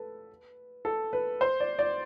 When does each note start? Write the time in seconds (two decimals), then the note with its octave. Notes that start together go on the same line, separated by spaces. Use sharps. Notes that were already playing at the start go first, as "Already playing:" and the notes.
Already playing: A4 B4
0.85 A4
1.13 B4
1.41 C5
1.60 D5
1.79 D5